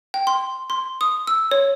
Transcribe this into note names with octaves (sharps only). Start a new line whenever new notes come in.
G5
C6
C6
D#6
E6
C#5